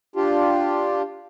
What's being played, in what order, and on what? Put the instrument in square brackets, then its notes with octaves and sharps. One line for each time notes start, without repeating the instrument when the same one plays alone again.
[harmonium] D4 F4 G4